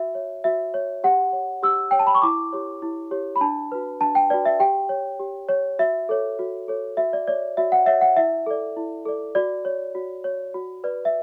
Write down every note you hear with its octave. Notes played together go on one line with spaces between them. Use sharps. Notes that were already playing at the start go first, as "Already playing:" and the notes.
Already playing: F#4 E5
C#5
F#4 E5
C#5
G4 F#5
C#5
G4 E6
C#5 G5
A5
B5
C#6
E4 D6
G4 C#5
E4
G4 C#5
B5
D4 A5
F#4 B4
D4 A5
G5
F#4 B4 D5
E5
G4 G5
C#5
G4
C#5
F#4 E5
A4 C#5
F#4
A4 C#5
F#4 E5
D5
C#5 D5
F#4 E5
F#5
C#5 E5
F#5
E4 E5
A4 D5
E4
A4 D5
F#4 D5
C#5
F#4
C#5
F#4
B4 D5
E5